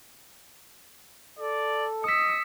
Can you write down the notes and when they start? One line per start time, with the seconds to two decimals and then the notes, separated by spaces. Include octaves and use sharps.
1.39 A4 D5
2.04 D#5 D#6 E6 B6 C#7